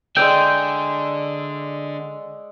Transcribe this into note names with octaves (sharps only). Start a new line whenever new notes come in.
D3 G#3 D5 E5 G5